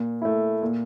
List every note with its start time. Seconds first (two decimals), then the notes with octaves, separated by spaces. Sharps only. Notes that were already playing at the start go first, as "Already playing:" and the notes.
Already playing: A#2
0.22 A3 E4
0.62 A#2